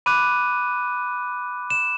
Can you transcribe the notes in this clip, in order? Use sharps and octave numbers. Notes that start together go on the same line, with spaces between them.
B5 D6 F#6 D#7
E7